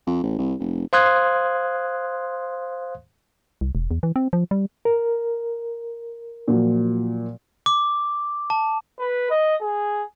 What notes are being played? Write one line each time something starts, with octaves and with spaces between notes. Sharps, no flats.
F2
A1
C2
F1
C5 F5 C6 D#6 F#6 G#6
C2
E1
E2
E3
C4
F3
G3
A#4
A#2 F3 F#3
D6
A5
B4
D#5
G#4